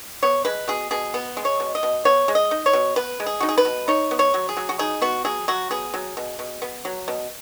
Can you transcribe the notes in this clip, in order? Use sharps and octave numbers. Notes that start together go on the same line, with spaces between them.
B3 C#5
G#3 B4
B2 G#4
B2 G#4
B3
G#3
C#5
B2
D#5
B2
B3 C#5
G#3
D#5
D#4
C#5
B2
B3 B4
G#3
G#4
D#4 F#4
G#4
B4
B2
D#4 C#5
B3
C#5
F#3
G#4
F#3
F#4
D#4 G#4
B3 F#4
F#3 G#4
F#3 F#4
B3 G#4
F#3
B2
B2
B3
F#3
B2